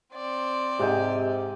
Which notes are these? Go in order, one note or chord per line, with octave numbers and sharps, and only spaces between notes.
C4 D5
G#2 C3 D#4 G4 G5 G#5